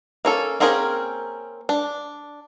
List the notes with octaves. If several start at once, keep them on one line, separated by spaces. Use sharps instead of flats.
A#3 C#4 A4
A#3 C4 C#4 G#4 A#4
D4